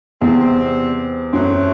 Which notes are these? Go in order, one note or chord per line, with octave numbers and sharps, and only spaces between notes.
E2 C3 G3 C4
F#2 F#3 A3 C4 F#4